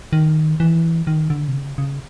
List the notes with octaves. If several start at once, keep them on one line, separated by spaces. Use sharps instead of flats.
D#3
E3
D#3
D3
C3
C#3
C#3